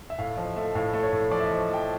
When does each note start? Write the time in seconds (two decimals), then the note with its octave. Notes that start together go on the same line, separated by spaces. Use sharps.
0.10 E5
0.18 A2 F5
0.37 F3 D#5
0.56 A3 E5
0.75 A2 F5
0.94 A3
1.03 C#5
1.13 A2
1.31 F3 D5
1.40 E5
1.46 D#5
1.51 F3
1.69 A3 G5